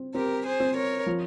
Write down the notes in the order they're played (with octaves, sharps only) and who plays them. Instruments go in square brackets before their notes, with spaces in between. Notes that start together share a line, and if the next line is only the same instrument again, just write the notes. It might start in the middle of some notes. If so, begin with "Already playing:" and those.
Already playing: [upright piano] C4
[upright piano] C4 [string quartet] G4 A#4
[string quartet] G#4 C5
[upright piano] C4
[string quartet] A#4 C#5
[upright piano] F3